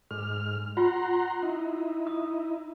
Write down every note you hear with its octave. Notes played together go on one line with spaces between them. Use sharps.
G#2 A4 F6
F4 F#5 A#5 C6
D#4 E4
D#6